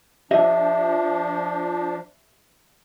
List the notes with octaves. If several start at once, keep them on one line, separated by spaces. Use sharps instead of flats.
F3 D4 G4 D#5 E5